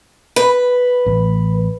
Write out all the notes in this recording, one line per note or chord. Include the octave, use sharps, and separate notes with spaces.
B4
A1